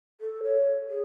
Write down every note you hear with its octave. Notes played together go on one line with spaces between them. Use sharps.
A4
C#5
G#4